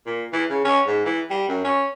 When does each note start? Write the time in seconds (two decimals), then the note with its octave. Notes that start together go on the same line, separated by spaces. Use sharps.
0.06 A#2
0.33 E3
0.50 C#3
0.65 C#4
0.87 G#2
1.05 E3
1.30 G3
1.48 F#2
1.64 C#4